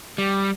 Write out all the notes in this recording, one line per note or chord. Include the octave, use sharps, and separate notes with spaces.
G3